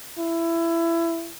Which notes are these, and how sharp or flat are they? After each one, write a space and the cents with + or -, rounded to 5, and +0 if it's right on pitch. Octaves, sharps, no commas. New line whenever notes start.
E4 +20